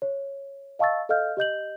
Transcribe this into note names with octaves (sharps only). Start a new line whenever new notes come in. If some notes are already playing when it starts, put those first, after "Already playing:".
C#5
D#5 F5 A5 C#6 E6 A6
A4 D#5 F5 F6 G6
G4 D#5 G6 F#7